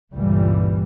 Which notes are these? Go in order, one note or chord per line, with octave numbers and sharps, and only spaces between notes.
G1 C#2 A#2 E3 G3